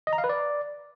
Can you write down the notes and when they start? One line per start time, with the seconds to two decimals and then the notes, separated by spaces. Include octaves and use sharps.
0.07 D#5
0.13 A#5
0.18 F5
0.24 B4
0.29 D5